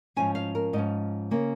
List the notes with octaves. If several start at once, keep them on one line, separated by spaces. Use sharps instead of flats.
G#2 F3 C#4 G#5
F5
A#4
G#2 F3 C#4 D#5
C#3 A#3 C#4